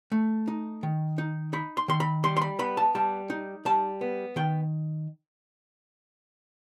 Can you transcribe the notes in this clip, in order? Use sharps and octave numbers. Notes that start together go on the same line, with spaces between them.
A3
D#4
D#3
D#4
D#4 B5
C6
D#3 C6
B5
G3 C6
C6
B5
B3 B5
A5
G3 A5
D#4
G3 A5
B3
D#3 G5